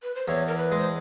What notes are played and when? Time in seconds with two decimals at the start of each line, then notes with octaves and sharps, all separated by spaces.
0.03 B4
0.15 C5
0.27 E2 C#5
0.47 A#4
0.57 B4
0.71 G#3
0.78 C5